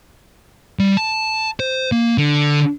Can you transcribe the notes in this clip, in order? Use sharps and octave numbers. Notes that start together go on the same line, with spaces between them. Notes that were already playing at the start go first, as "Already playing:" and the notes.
G3
A5
C5
A#3
D3